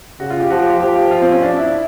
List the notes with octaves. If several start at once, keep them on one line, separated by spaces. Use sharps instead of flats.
C#3 F#4
F4
G4
F3 F#4
G4
G4
F3 G4
G4
F4
C4
C#4
D4
E4
E4